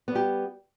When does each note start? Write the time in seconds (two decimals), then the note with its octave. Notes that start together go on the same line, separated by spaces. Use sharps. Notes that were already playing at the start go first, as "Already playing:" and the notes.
0.08 B3
0.12 G3
0.15 G4